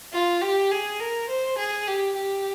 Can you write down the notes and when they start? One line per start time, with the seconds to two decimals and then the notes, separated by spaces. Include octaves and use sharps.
0.13 F4
0.42 G4
0.71 G#4
1.00 A#4
1.29 C5
1.58 G#4
1.87 G4
2.16 G4